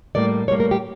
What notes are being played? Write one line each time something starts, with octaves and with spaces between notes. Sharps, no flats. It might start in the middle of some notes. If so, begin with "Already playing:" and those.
A2 G3 A#3 D5
A2 G3 A#3 C#5
A#4
G4